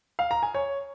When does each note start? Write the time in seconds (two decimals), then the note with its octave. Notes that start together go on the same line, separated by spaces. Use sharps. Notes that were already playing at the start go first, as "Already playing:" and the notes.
0.19 F5
0.31 A#5
0.43 G#5
0.54 C#5